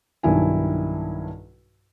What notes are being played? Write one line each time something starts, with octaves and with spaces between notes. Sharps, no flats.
B1 G2 D#3 E4 G#5